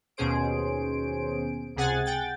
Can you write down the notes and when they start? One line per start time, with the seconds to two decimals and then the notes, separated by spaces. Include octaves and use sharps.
0.17 D#2 B2 C#4 G#4 C5 D7
1.76 C#2 C3 G#4 F#5 G#5 A6
2.06 F#5 G5 A6